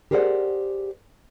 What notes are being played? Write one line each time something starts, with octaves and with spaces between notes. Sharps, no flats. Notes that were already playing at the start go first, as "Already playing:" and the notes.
G4 G#4 A#4 C5 D5 F#5